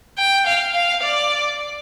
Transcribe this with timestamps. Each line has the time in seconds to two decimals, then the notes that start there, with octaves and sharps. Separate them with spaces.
0.18 G5
0.47 F5
0.75 F5
1.03 D5